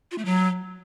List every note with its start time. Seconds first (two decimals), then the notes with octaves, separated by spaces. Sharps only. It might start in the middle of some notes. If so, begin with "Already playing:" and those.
0.11 F4
0.18 A3
0.25 F#3